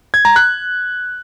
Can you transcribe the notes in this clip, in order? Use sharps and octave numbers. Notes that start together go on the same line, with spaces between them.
G#6
A#5
F#6